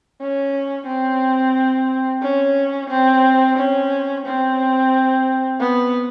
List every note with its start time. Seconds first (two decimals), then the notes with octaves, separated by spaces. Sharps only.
0.21 C#4
0.88 C4
2.22 C#4
2.90 C4
3.57 C#4
4.26 C4
5.60 B3